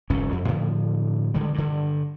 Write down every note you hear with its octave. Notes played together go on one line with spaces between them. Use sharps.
F1 C2 G2 C#4
F2
A2 D3 F3
D3 D#3 G3 G#3
G2 D3